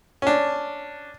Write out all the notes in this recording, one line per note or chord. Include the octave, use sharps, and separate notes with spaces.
C#4 D4